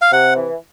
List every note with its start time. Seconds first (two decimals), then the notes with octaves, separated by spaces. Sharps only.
0.01 F5
0.12 C3 F#5
0.36 E3